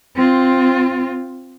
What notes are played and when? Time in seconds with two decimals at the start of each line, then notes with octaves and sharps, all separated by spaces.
0.15 C4 F4